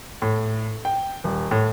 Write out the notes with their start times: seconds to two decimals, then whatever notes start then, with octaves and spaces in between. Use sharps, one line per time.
0.22 A2
0.85 G5
1.24 D#1
1.51 A2